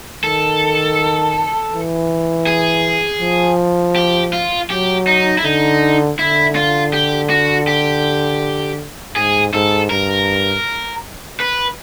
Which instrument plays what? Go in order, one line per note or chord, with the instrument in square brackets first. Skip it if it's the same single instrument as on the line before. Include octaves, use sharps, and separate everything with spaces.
[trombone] D#3 [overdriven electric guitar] A4
[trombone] E3
[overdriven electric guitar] G#4
[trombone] F3
[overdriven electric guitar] G4
F4
[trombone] F#3 [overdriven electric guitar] G4
[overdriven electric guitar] D#4
E4
[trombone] D3 [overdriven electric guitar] D#4
[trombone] D3 [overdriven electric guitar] E4
[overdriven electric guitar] F4
G4
F#4
G4
[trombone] G#2 [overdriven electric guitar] G#4
[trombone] G#2 [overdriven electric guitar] A4
[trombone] G2 [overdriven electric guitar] A#4
[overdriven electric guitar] B4